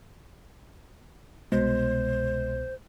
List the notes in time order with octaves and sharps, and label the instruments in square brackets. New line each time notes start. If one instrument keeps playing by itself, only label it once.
[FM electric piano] C2 B2 [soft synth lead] G#3 [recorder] C5